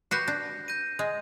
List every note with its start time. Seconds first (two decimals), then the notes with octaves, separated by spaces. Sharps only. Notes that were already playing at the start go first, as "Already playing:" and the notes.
0.11 F#4 G4 B4 G6 A#6 C7
0.28 D4
0.68 G6 A#6 D#7
0.99 G#3